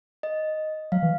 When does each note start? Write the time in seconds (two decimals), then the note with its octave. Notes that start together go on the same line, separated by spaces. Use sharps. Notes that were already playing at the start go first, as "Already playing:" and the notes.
0.23 D#5
0.92 F#3 F5
1.02 E3